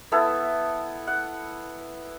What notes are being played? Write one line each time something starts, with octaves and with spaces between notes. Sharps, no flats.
B3 E4 A4
F#5